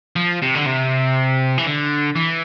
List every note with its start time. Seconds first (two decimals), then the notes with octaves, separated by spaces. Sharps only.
0.16 F3
0.42 C3
0.55 D3
0.66 C3
1.58 E3
1.65 D3
2.16 E3